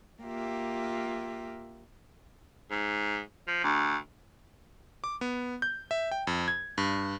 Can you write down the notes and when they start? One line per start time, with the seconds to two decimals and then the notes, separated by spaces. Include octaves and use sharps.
0.23 A#3 F4 G4 E5
2.71 G#2
3.48 F3
3.64 D2
5.04 D6
5.21 B3
5.62 G6
5.91 E5
6.12 G5
6.27 F2
6.48 G#6
6.78 G2